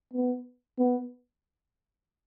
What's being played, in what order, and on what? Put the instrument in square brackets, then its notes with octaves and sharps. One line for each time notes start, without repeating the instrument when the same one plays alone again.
[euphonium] B3
B3